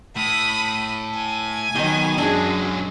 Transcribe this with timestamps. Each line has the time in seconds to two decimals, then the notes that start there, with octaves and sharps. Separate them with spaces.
0.16 A2 B5 D#6
1.15 G#5
1.75 B2 D#3 F#3 D#5 G5
2.18 F#2 F#3 G#3 D4 G#4